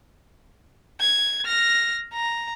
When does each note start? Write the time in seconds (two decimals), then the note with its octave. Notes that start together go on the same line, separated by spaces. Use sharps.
1.00 G#6
1.45 F6 A#6
2.13 A#5